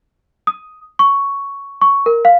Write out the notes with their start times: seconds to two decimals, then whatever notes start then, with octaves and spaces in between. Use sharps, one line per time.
0.47 D#6
0.99 C#6
1.81 C#6
2.06 A#4
2.25 F5